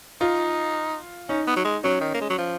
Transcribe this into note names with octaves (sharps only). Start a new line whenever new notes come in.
D#4 F4
C#4 D#4
B3
F#3
G#3
F#3 C#4
D#3
A#3
G#3
F#3
F3